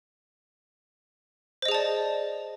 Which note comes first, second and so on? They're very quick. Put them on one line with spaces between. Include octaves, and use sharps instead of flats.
C5 D#5 G#4 A5 D5